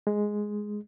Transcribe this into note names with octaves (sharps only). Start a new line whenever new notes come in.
G#3